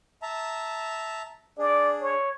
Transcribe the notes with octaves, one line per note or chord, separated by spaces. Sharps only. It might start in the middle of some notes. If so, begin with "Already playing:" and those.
E5 A5 A#5
D4 G#4 D5
C#5